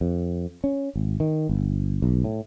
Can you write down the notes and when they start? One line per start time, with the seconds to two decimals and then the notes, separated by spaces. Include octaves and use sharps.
0.01 F2
0.64 C#4
0.96 G#1
1.20 D#3
1.49 G1
2.02 B1
2.24 A2